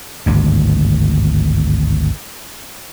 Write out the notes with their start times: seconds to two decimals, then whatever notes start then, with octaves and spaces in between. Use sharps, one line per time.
0.26 G#1 D2 G2